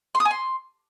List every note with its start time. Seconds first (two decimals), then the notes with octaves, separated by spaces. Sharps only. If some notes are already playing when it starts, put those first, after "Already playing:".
0.15 C6
0.20 D#6
0.25 G#5
0.31 C6